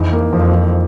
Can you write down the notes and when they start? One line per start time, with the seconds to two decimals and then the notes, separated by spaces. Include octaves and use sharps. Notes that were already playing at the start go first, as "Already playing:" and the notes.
Already playing: F2 E3 D#4
0.12 A#3
0.33 F2 F3
0.53 F3